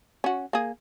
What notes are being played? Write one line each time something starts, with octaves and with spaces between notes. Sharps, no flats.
C#4 F#4
A#3 G#4